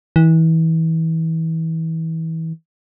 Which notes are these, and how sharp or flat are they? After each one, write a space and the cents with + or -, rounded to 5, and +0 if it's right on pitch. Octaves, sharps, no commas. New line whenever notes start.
E3 -30